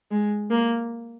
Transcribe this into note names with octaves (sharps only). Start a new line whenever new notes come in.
G#3
A#3